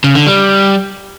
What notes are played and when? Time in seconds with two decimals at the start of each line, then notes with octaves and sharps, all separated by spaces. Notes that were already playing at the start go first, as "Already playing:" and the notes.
0.04 C#3
0.15 D3
0.27 G3